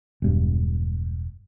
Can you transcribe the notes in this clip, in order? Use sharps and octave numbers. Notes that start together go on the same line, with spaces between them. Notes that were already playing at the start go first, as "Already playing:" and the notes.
E1 G2